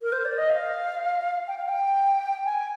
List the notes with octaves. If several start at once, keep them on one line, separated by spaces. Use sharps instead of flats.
A#4
C5
D5
D#5
F5
G5
F5
G5
G#5